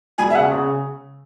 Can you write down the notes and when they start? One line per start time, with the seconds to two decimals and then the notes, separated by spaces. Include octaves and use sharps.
0.18 E1 G#5
0.30 E5
0.35 C#3 F#5
0.52 C#3